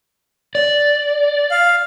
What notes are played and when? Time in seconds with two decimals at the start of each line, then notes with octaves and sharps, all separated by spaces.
0.55 D5
1.51 F5